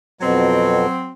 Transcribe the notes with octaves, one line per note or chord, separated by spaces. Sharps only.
F2 B2 F#3 C4